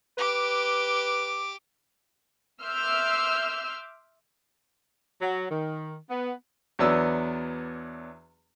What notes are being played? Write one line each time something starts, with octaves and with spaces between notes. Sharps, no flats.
G4 B4 D6
E5 C6 D6 E6 F6 G6
F#3
D#3
B3
E2 F#3 B3 D4 E6